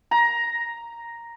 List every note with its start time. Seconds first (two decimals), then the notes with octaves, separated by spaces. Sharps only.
0.11 A#5